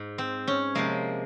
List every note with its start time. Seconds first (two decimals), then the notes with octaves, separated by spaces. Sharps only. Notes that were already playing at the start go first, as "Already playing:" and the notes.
Already playing: G#2
0.18 C4
0.47 C#4
0.75 C3 F3 G#3 A#3